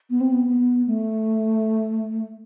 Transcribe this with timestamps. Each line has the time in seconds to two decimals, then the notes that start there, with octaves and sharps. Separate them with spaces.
0.10 B3
0.21 C4
0.32 B3
0.48 B3
0.87 A3